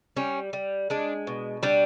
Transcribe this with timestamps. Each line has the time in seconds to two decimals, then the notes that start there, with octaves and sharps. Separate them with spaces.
0.16 G3 C#4
0.53 G3
0.90 G#3 D4
1.27 B2
1.63 G3 D4